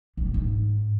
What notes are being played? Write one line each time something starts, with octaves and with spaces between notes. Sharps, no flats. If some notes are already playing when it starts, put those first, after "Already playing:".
A2
A#2
G#2